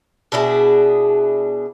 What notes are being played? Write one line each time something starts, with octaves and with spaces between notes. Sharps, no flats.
B2 D4 E4 G#4